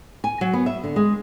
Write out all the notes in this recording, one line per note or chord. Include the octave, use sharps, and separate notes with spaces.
G#5
F#3
B3
E5
D3
G#3